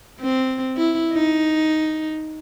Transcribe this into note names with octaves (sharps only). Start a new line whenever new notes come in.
C4
E4
D#4